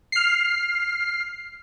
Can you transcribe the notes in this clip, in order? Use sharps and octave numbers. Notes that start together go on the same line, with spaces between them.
F6 C7